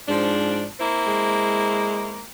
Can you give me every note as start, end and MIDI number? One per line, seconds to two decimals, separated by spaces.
0.09 0.68 44
0.09 0.68 53
0.09 0.68 62
0.80 2.21 58
0.80 2.21 60
0.80 2.21 64
1.07 2.26 56